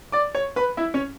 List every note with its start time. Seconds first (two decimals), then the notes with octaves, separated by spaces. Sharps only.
0.12 D5 D6
0.35 C#5 C#6
0.56 B4 B5
0.77 E4 E5
0.94 C#4 C#5